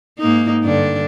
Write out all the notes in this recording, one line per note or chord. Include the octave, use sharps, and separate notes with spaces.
G#2 A#3 D#4
G2 D3 D4